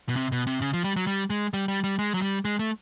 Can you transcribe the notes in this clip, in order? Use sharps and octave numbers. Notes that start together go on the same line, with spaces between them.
B2
C3
B2
C3
C#3
F3
G3
F#3
G3
G#3
G3
G3
G3
G#3
F#3
G3
G#3
A3